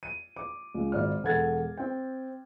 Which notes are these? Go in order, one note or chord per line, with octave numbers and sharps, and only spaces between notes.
D#7
D6
C#2
G#1 D5 F6
E1 A4 F#5 G#6 A6
C4 G5